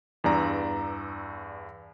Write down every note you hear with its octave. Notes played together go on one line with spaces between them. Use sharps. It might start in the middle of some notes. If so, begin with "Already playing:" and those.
E2 G2 D5 A#5